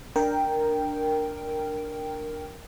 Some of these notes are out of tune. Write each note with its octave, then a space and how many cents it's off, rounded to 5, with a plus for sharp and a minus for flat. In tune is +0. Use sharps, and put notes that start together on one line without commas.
D4 +0 A#4 +0 G5 +0